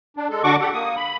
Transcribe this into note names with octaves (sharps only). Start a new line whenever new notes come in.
D4
G#3 A4
D3 D4 F#4 F#5 C#6 D6
G4 A4 F#5
A#3 D#6
B5